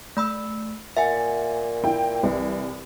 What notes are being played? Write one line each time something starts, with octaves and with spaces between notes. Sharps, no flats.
A3 B5 E6
A#2 E5 F#5 G#5
E4 G5
C2 E3